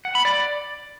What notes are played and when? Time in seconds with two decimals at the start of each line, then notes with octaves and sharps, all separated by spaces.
0.05 F#5
0.15 B5
0.25 D5